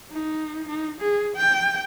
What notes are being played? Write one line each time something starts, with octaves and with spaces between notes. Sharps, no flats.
D#4
D#4
G#4
G5